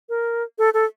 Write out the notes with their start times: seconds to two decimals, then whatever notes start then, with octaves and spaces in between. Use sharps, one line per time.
0.09 A#4
0.59 A4
0.74 A4